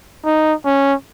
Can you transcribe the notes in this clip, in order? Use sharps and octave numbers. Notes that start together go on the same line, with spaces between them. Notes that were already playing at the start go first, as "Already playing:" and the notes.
D#4
C#4